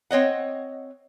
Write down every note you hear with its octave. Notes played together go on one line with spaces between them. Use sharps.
C4 C#5 D#5 F#5